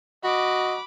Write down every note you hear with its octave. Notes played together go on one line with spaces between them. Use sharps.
F#4 D#5 B5 D6